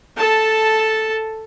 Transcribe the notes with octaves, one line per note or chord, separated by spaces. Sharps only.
A4 A5